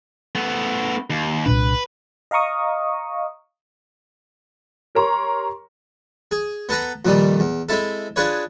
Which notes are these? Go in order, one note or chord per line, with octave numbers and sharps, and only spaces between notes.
A3 B3
D#2
C2 A#2 D4 B4
D#5 F5 A#5 C#6 D#6
G4 A#4 C#5 A#5 C6 C#6
G#4
B3 A4 B4 A#5
F2 A#2 D#3 G3
E2
G#3 C4 E4 A4
D4 F4 G#4 B4 C#5